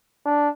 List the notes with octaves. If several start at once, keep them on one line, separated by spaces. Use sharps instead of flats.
D4